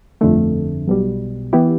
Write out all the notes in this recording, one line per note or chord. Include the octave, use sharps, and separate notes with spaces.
G1 F2 D3 A3
B1 B2 G3
E3 B3 E4 G4